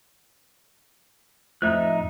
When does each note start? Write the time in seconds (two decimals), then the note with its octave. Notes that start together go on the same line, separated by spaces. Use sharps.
1.62 F2 A2 F3 D#4 E5 F#6